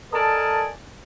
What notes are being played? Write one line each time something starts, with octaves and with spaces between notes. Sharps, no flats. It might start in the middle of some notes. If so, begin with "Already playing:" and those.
A4 A#4 D5 D#5 G#5 A5